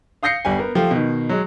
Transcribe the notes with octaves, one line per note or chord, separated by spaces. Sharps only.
F5 D#6 G6 A#6 C7 C#7
G1 G3 G#5
B3 A#4
F3 A3 F4 G4
B2 D#3
F#3 G#3